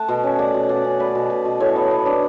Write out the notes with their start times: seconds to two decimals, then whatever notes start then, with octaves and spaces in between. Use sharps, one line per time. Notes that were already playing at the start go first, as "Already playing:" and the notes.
Already playing: A3 F#5 A5
0.08 B2
0.23 C#4
0.39 A3 D5 F#5
0.54 B2
0.69 B2 D5 F#5
0.84 C#4
0.99 A3 B4 D5
1.15 B2
1.30 B2
1.45 B2
1.60 A2 A4 C#5
1.76 B3
1.91 B3
2.06 D4